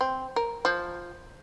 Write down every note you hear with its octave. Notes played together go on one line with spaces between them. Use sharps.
C4
A#4
F3